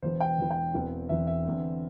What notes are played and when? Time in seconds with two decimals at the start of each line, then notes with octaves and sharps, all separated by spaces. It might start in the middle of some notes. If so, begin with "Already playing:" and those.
0.02 E1 E2 E3 C5
0.20 G5
0.38 E1 E2 E3
0.51 G5
0.74 E1 E2 E3 C4
1.09 E1 E2 E3 C4 E5
1.27 E5
1.45 E2 D3 C4